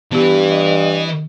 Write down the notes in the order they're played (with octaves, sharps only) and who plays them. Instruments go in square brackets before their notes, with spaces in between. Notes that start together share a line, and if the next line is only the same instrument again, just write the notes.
[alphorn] G2 [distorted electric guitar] E3 [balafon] B3 G4
[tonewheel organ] D#5